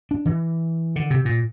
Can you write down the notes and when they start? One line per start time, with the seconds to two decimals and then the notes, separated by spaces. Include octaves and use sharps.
0.11 D4
0.25 E3
0.96 D3
1.10 C3
1.25 A#2